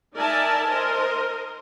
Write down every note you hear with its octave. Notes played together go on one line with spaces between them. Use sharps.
D#4 A#4 D5 E5 G#5 A5
A#4 C5 D#5